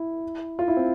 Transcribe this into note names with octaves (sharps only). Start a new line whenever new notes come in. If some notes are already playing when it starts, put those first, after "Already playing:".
Already playing: E4
F4
E4
C4